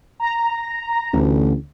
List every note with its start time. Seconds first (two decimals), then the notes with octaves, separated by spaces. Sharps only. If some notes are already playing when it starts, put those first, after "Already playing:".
0.20 A#5
1.13 A1 D2